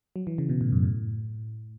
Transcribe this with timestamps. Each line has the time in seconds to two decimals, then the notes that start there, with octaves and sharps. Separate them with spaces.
0.16 F#3
0.27 E3
0.38 C#3
0.49 B2
0.61 A2
0.72 F#2
0.83 A2